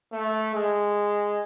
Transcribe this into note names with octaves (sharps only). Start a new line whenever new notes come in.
A3
G#3